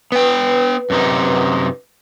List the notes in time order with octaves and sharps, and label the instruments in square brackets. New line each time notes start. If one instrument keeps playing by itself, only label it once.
[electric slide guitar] B3 G5 [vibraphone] B4
[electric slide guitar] F#2 C3 D#4